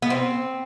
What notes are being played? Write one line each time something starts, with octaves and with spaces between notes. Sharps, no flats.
B3
C4